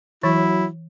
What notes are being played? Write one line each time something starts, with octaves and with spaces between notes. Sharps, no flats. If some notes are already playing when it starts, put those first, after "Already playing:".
E3 F#3 E4